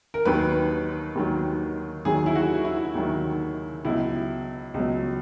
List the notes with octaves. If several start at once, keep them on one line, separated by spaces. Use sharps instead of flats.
A#4
D#2 D#3 F#3 B4
D#2 D#3 F#3
D#2 D#3 F#3 G#4
E4
F#4
E4
D#2 D#3 F#3
C#2 B2 F#3 E4
C#2 B2 F#3